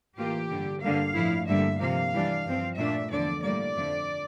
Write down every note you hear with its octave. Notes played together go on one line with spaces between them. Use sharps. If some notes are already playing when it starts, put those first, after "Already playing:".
A2 E3 A#3 F4 G4
G2 D3 G3
G2 D3 G3 A#3 F5
A2 F3 A3 E4
G2 D3 G3 A#3 E5
C3 F3 A#3 F5
E3 G3 D4
G2 F3 C4
A#2 A3 D4 E5
E2 D3 F3 D5
A2 G3 A#3 D5
F2 D3 F3 A3